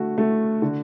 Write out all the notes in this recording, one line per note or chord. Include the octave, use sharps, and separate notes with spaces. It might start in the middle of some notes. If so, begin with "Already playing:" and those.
Already playing: D3 A3 F#4
A3
D3